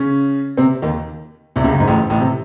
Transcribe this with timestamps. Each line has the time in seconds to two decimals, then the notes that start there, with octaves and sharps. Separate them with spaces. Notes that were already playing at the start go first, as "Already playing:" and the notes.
Already playing: C#3 C#4
0.57 C3 C4
0.82 D#2 D#3
1.56 C2 C3
1.64 C#2 C#3
1.72 F#2
1.80 G#2
1.88 A1 A2
2.10 A1 A2
2.21 C3